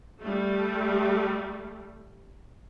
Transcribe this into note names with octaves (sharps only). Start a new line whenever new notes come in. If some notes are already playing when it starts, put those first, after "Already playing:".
G3 A3